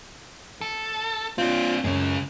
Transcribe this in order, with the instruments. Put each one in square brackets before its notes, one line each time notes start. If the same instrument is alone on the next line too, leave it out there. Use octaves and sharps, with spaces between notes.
[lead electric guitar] A4
[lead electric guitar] C4 D4 [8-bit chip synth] F4
[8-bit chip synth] F#2 [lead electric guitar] C#3 G#3